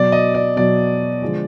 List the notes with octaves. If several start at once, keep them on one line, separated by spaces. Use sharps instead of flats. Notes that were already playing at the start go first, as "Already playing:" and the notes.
Already playing: B2 F#3 D5
D#5
D5
B2 F#3 D5
D3 F3 G#3